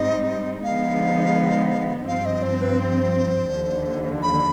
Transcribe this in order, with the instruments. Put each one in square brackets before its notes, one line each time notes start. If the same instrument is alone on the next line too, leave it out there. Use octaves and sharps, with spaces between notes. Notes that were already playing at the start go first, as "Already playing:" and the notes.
Already playing: [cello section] G#2 G3 C4 D#4 [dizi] D#5
[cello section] D3 F3 G#3 B3 D#4 [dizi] F5
[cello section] G2 F3 C4 [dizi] F5
[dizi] D#5
C5
B4
C5
[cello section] D#2 D3 F3
[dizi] B5